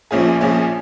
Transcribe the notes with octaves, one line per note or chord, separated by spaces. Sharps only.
A#1 A#2 F3 C#4 G#4
A#1 A#2 F3 C#4 G#4